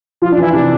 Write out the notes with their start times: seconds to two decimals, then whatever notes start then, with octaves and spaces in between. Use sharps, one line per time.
0.22 F3 F4
0.32 D4
0.37 E3
0.42 E4
0.52 C3 D4